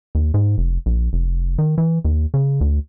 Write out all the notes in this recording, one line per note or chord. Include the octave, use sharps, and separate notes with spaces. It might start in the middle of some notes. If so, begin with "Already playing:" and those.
D#2
G#2
F1
A#1
F1
D#3
E3
D#2
C#3
D2